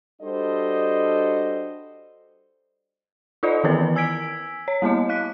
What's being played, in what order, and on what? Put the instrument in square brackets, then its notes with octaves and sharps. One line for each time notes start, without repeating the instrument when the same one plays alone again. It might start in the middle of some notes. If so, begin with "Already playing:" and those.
[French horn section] G3 D4 F#4 A4 C5 D#5
[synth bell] D#4 F4 A4 C5 D5 D#5
D#3 E3 B3 E4 A#4 B4
G#5 E6 G#6 B6 D7
C#5
G3 A#3 B3 E4 D#5
F5 F#6 B6